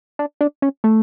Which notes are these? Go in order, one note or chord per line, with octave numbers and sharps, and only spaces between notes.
D4
D4
C#4
A3